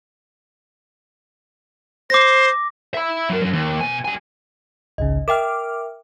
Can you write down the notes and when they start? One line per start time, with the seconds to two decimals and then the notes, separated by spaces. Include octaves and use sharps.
2.10 C5 D6 A#6
2.94 E5 B5
3.30 F#3 A#4
3.42 F#3 C#4
3.53 D#2
3.81 B2 G#5
4.05 G3 G#5
4.98 G#1 C#2 C#3 D#5
5.28 A#4 E5 G5 D6 F6